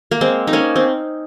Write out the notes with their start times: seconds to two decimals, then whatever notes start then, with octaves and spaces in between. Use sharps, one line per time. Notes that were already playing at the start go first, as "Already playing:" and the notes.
0.11 A#3
0.21 G#3 C4
0.47 D#4
0.53 A#3 C#4
0.76 C4